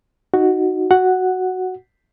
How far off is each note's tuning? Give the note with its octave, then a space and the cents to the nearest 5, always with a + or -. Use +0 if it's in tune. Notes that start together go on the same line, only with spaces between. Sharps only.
D#4 +0 F#4 +0
F#4 +0 F#5 +0